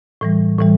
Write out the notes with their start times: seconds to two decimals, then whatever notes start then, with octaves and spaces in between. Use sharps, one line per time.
0.21 A2 E3 G3
0.59 A2 E3 G3